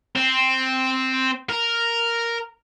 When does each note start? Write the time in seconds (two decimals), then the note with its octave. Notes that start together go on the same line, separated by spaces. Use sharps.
0.16 C4
1.49 A#4